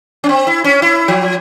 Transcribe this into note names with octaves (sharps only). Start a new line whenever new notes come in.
C#4
C4
E4
C#4
E4
F3